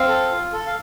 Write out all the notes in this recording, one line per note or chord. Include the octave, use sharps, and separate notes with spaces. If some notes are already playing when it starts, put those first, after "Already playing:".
Already playing: C4 F5
A4
F4
A4
F5